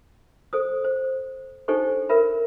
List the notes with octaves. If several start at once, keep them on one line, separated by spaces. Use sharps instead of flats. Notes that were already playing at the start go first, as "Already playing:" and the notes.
A4 C5 D#6
C5
D4 D#4 G4 A4 C5 C#6
A#4 B4 E5 B5